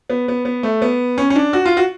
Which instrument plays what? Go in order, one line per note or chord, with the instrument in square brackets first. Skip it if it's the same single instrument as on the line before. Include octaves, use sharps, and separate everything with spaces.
[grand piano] B3
B3
B3
A3
B3
C#4
C#4
D4
F#4
F4
F#4